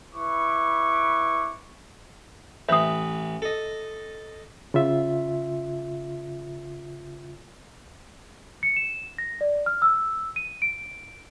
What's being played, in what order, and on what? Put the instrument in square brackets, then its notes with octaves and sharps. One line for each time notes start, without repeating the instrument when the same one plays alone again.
[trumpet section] E4 B4 C#6 D6
[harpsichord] A1 B4 [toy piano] E5 D#6
[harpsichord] A4 D#5
[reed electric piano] C#3 F4 E5
[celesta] C#7
E7
A#6
D5
F6
E6
D#7
D7